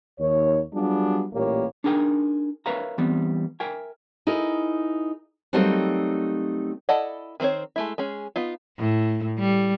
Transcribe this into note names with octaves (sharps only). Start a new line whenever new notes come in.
D#2 C#5
F#3 G3 B3 D4 F4 G#4
A1 A#2 G3 A#3 G4 C#5
D4 D#4 G#4 A#4 G5
A#4 B4 C#5 E5 F5 A#5
E3 G3 B3 C4
A#4 E5 G5 G#5
D#4 E4 G#4 A#4
F#3 G3 A3 A#3 C4 D#4
E4 A4 D5 D#5 F#5
D#3 C4 E4 C5 C#5
G#3 A3 E4
G#3 C#4 G#4
B3 D#4 F4
A2
G3